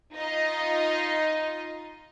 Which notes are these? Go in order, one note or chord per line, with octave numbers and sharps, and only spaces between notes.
D#4 F4 D#5